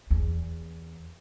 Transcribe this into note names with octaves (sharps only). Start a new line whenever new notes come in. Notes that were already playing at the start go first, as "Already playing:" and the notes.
E2